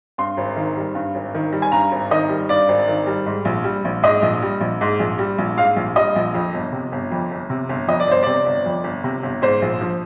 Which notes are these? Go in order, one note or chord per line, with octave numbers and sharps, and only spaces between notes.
G2 C6
G#1
D#3
G3
G2
G#1
D#3
G3
G#5
G2 A#5
G#1
D#3 D#5
G3
G2 D5
G#1
D#3
G3
G#2
A#1
G3
A#1
G#2 D#5
A#1
G3
A#1
G#2
A#1
G3
A#1
G#2 F5
A#1
G3 D#5
A#1
F2
G1
C3
G1
F2
G1
C3
G1
F2 D#5
D5
G1 C5
C3 D5
G1
F2
G1
C3
G1
G#2 C5
A#1
F3